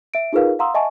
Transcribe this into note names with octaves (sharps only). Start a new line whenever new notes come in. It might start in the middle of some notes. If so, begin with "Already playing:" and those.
E5 D7
D#4 F4 G#4 A#4 B4 F5
F5 F#5 A#5 C6 D#6 E6
D#5 E5 F#5 G#5 A5 C#6